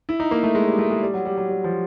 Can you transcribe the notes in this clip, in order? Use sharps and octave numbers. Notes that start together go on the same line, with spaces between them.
E4
D#4
A#3
A3
G#3
G3
A3
G#3
G3
F#3
G3
F#3
G3
F3